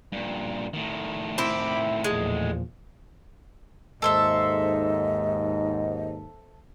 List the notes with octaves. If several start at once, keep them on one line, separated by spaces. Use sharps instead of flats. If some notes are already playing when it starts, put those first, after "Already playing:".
G2 A#2
A2 D#3
C4 E4 B5 D6
E2 A#2 F3 G#3
D#2 G#2 A4 C5 D#5 E5